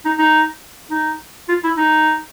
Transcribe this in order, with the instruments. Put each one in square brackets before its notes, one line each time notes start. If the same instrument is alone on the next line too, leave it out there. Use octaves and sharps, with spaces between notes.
[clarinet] D#4
D#4
D#4
F4
E4
D#4